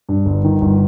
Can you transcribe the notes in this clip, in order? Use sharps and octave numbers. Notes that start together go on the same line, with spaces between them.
G2
G1
D#3
G1